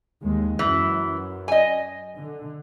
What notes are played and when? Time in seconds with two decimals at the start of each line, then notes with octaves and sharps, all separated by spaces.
0.22 D#2 G#3
0.59 F#2 E3
1.48 D#5 G#5
2.16 D3